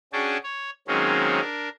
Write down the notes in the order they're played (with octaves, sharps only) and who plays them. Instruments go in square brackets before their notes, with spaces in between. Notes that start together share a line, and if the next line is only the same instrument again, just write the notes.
[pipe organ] C#4 D4 F#4 G#4 G5 A5
C#5
D#3 F#3 G#3 A#3 C4 C#4
D4 A#4